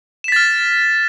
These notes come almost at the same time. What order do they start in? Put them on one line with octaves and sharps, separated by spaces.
E7 B6 A6 F6